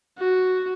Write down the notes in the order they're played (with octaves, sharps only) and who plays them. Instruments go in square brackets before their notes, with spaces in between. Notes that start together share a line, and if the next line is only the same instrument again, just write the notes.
[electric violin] F#4